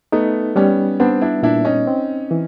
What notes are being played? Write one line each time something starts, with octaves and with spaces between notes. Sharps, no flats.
A3 B3 D#4
G3 B3 C#4
B3 C4 D4
D4 E4
A#2 D4 E4
C#4 D#4
C4
E3